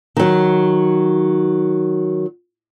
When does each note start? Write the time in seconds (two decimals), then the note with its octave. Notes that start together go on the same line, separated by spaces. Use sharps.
0.17 D#3 F#3